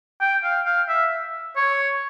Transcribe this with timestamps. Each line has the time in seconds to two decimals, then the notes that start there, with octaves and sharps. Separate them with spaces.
0.21 G5
0.44 F5
0.66 F5
0.88 E5
1.56 C#5